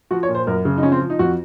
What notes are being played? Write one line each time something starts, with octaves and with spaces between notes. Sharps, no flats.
F3 F#4
C#5
A#2
C5
F#2 A#4
C#3
D#4
F3 C#4
C4
F3
D#4
F2 F#4